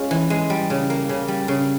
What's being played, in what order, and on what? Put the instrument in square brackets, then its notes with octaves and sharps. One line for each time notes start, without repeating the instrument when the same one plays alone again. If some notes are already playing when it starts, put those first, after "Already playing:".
Already playing: [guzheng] G#3 C#4 F4
E3
G#3
G3
C#3
A#3
C#3
G3
C#3